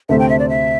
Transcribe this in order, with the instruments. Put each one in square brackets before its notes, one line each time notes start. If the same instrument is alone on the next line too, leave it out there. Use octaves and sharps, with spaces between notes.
[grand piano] D2 C3 A3 C4 A4 [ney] E5
[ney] G5
E5
D5
E5